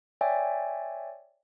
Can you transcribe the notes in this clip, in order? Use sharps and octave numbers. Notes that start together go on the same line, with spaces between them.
C#5 D5 E5 G5 G#5